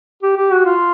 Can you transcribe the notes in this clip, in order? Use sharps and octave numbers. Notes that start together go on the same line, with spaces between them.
G4
G4
F#4
F4